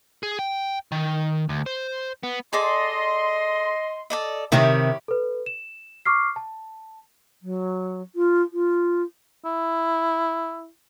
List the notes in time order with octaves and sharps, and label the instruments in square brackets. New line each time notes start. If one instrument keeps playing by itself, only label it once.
[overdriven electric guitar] G#4
G5
D#3
D2
C5
B3
[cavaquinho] G#4 A4 D5 [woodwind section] D#5 C6
[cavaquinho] A4 D5 D#5
[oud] C3 D#3 [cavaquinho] E4 G4 C#5
[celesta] A4 B4
E7
C#6 D6 F6 C7
A5
[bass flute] F#3
F4
F4
[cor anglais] E4